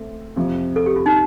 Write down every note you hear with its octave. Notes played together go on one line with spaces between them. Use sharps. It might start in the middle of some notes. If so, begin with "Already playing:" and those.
Already playing: A3 C4
F2 C3 F3
A4
G4
F4
D#4